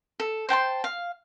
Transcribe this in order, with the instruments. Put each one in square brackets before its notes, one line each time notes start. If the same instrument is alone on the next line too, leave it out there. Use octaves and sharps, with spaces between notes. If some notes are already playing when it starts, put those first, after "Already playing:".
[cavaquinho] A4
C5 G5 A5 C6
F5